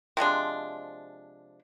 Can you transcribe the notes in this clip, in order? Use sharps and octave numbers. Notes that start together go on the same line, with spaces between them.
C3 F3 G#3 D4